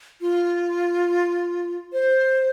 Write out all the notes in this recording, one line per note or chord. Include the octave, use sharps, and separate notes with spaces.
F4
C5